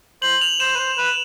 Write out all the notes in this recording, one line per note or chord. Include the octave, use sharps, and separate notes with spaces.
C5 F#7
F7
C5 E7
B4
C5
B4